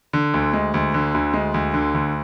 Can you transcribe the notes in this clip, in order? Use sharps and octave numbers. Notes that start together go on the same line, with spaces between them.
D3
D2
G#3
D2
D3
D2
G#3
D2
D3
D2